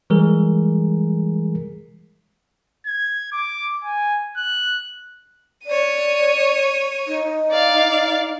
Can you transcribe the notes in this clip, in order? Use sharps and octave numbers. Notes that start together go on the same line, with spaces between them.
E3 G3 G#3 G#4 A#4
G#6
D6
G#5
F#6
C#5 D5 D#7
D#4
D5 F5